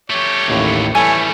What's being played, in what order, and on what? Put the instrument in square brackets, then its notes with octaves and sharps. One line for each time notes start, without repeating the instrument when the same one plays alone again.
[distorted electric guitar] A3 G4 [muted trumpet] C#5
[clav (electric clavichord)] A1 D#2 A2
[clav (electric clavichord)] E3 A4 [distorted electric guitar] G3 A3 [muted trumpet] C#5 [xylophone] G#5